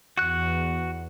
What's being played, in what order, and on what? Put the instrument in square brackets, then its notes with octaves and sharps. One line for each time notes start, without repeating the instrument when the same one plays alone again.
[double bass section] E2 [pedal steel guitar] F#4 F#6